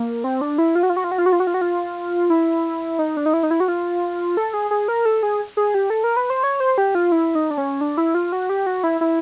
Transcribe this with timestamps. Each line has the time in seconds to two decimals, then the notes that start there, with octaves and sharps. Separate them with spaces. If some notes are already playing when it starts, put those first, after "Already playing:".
Already playing: A#3
0.24 C4
0.41 D4
0.58 E4
0.75 F4
0.83 F#4
0.89 F4
0.96 F#4
1.04 F4
1.11 F#4
1.18 F4
1.26 F#4
1.32 F4
1.40 F#4
1.47 F4
1.54 F#4
1.61 F4
2.30 E4
2.99 D#4
3.17 D4
3.26 D#4
3.33 E4
3.43 D#4
3.51 E4
3.60 F#4
3.68 F4
4.37 A4
4.54 G#4
4.71 G#4
4.88 A#4
5.05 A4
5.23 G#4
5.57 G#4
5.74 G4
5.90 A4
6.04 A#4
6.17 B4
6.30 C5
6.43 C#5
6.60 C5
6.78 G4
6.95 F4
7.12 E4
7.35 D#4
7.51 D4
7.58 C#4
7.81 D4
7.97 E4
8.15 F4
8.32 F#4
8.49 G4
8.66 F#4
8.84 E4
9.01 E4